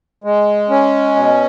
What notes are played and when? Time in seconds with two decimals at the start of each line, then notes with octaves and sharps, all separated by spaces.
0.24 G#3
0.70 C#4
1.16 B2